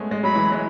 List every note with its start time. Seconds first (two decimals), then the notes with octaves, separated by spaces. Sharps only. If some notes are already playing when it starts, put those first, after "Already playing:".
Already playing: G#3 A3 B3 C#4
0.11 G#3
0.23 F#3 B5
0.35 E3
0.52 G#3